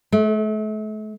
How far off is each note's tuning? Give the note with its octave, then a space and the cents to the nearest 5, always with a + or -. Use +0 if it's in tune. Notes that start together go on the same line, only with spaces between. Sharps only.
A3 -40